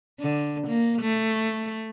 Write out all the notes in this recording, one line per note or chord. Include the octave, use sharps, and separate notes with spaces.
D3
A#3
A3